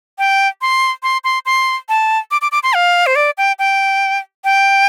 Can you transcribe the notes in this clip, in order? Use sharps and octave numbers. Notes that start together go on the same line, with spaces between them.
G5
C6
C6
C6
C6
A5
D6
D6
D6
C6
F5
C5
D5
G5
G5
G5